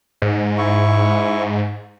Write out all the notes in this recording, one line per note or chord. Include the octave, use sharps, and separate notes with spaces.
G#2
E4 C#6